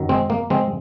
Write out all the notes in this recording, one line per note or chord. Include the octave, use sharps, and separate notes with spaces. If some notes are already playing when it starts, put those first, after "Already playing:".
Already playing: F#2 D#3 F#3
G#3 C4
A#3
G#3 C4